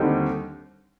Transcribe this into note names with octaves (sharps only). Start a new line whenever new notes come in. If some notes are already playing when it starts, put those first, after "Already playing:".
Already playing: D#2 D3 G3 C4 D#4